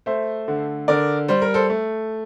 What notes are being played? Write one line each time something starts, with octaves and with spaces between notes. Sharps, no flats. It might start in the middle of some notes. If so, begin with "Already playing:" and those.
A3 C5 E5
D3
D3 A#4 D5
G3 C5
A#4
A4 C5
A3